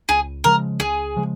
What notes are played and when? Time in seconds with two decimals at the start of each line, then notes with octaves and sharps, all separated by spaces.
0.09 C#2 G#4
0.44 C#3 F3 G#3 A#4
0.80 C#2 G#4
1.16 C#3 F3 G#3